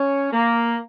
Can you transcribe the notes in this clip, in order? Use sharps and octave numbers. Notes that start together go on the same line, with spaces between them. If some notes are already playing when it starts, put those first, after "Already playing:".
Already playing: C#4
A#3